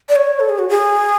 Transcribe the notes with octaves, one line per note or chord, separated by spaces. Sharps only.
D5
C#5
A4
G#4
F#4
G#4